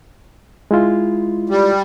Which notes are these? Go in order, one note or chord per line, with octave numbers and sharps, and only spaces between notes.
G#3 E4 F4
G3